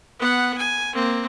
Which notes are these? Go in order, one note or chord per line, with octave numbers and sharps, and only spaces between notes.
B3 F#5
G#5
A#3 C4